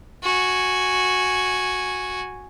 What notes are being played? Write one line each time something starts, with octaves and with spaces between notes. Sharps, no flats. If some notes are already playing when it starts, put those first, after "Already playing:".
F#4 G#5